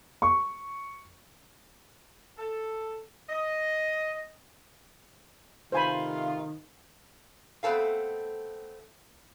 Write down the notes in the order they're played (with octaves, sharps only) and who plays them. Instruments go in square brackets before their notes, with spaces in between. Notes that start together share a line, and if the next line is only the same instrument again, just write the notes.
[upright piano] C#6
[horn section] A4
D#5
[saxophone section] C3 A3 F4 [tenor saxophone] D#3 [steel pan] C5 G#5 B5
[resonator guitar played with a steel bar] A3 B3 C4 A4 F5